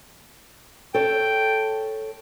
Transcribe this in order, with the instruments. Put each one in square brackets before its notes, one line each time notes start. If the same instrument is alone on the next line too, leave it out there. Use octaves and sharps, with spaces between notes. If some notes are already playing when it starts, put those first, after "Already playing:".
[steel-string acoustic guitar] A4 C#5 [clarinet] G5